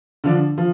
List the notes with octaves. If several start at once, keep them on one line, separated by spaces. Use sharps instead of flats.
D3 F3 D4
F3